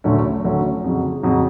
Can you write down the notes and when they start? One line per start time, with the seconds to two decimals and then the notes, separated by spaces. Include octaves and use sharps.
0.04 D2 D3 F#3 A3 C#4
0.44 D2 D3 F#3 A3 C#4
0.84 F2 C#3 F#3
1.23 F2 C#3 F#3